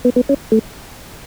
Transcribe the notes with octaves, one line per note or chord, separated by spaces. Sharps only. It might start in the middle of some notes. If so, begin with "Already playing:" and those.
B3
B3
C#4
A3